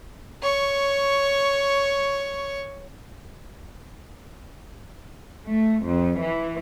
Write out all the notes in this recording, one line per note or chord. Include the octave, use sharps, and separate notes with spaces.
C#5 C#6
A3
F2
E3